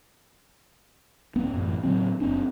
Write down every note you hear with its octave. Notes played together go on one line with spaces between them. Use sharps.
D1 B3 C#4
A1 F#2
A2 C#3 F#3 C4
F#1 C4 D4